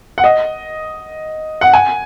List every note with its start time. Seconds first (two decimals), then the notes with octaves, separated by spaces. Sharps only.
0.18 F#5
0.24 D#5
1.61 F#5
1.73 G#5